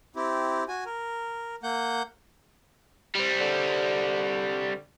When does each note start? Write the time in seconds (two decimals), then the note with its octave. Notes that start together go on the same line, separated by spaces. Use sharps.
0.16 C4 E4 G4
0.68 F#4 G#5
0.86 A#4
1.63 A#3 F#5 G6
3.15 G3 C4
3.41 D3